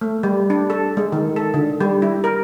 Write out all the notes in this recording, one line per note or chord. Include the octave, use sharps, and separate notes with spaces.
A3
G3
D4
A4
G#3
D#3
A4
D3
G3
E4
A#4